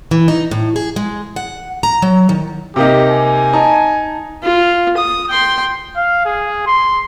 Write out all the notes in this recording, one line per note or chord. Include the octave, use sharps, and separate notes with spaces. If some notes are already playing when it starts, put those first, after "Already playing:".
E3
D#4
A2
G#4
G#3
F#5
A#5
F#3
D#3
C3 A#3 D#4 G4
G#5
D#4 A5 A#5
F4
D#6
G5 C6
F5
G#4
C6